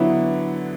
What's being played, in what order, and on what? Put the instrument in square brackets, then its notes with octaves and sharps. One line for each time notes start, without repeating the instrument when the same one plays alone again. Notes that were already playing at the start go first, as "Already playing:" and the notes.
Already playing: [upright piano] D3 F#3 B3 [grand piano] E4